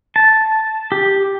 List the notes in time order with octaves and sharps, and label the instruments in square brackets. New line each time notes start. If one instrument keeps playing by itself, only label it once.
[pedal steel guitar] A5
G4